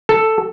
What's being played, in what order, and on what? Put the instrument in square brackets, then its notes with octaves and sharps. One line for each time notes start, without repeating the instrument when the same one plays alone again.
[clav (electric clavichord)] A4